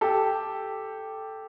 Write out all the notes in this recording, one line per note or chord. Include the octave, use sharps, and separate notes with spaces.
G4 A4